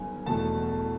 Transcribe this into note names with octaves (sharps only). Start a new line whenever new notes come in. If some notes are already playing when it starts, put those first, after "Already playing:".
Already playing: G1 F#2 D#3 G3 B3 G#5
E1 E2 B2 F#3 A3 A5